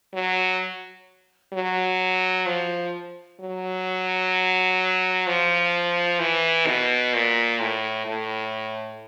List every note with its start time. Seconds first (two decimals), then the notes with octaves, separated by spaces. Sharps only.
0.13 F#3
1.53 F#3
2.46 F3
3.40 F#3
5.27 F3
6.20 E3
6.67 B2
7.14 A#2
7.60 A2
8.06 A2